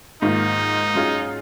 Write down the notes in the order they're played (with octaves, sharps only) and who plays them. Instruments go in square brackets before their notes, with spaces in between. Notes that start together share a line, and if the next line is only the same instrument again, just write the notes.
[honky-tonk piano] G#2 D#3 A#3 F4 [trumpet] D#4
[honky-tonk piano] F#3 C#4 F4 G#4